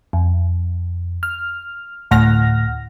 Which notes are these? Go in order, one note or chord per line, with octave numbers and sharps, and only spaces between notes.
F2
F6
D2 A2 F#5 F6 A#6